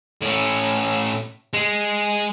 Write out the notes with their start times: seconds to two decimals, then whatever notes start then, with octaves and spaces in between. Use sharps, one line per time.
0.21 A2 C#4
1.54 G#3